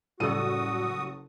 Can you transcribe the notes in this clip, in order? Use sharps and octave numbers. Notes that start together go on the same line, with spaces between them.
F#1 A2 G3 F#4 A4 D#6 D#7